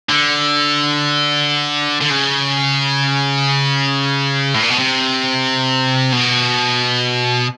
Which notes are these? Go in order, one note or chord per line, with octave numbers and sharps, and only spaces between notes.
D3
D3
C#3
A2
A#2
B2
C3
B2